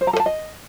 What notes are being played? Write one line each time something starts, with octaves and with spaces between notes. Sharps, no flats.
C5
A#5
A4
A5
D#5